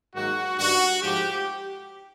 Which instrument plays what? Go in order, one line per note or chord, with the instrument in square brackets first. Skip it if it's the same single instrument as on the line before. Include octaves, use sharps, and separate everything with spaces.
[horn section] G#2 D#3 F#3 A#3 F#4
G2 D#3 G3 F#4
G#2 F3 A3 G4